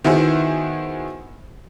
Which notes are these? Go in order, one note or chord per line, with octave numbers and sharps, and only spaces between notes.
D#3 B3 E4 F#4 G#4 C5